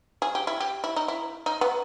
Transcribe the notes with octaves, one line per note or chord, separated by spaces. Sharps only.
G#4
G4
E4
G4
E4
D#4
E4
D#4
B3